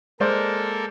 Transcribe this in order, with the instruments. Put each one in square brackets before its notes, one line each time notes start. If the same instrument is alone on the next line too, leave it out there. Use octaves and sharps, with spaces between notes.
[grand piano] G#3 C5 D5 [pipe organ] A#3 A4 A#4